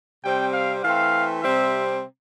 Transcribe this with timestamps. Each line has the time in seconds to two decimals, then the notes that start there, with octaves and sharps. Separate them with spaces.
0.23 C3 G3 C4 G5
0.54 F5
0.83 E3 A3 C4 F5
1.42 C3 G3 C4 E5